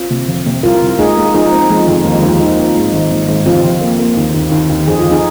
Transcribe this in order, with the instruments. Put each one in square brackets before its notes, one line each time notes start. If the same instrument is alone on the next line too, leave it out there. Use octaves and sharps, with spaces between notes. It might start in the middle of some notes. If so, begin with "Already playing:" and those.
Already playing: [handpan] C4 F4
[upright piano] C3
F1
C3
[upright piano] C2 [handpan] F4 A#4
[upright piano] C2
[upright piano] G#3 [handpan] D#4 G#4
[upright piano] G#3
[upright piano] F3 [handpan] D#4 G#4
[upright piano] C4
[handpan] F3 [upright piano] G#3
[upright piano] F2
[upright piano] D#2 [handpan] A#3
[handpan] G#3
[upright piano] D#2 [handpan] F3
[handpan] G#3
[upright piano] D#3
C4
[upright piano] G#2 [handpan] G#3
[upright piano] G#1
G#1
G#1
[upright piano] F1 [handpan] C4 F4
[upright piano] F1
A#3
A#3
D#2
D#2
D#2
D#2
[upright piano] F2 [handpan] G#4
[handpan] F4
[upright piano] F2
[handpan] D#4 G#4